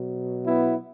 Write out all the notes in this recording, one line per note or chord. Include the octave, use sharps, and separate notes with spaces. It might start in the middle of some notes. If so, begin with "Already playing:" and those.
Already playing: B2 F#3
B3 E4